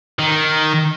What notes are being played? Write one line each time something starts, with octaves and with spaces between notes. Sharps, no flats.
D#3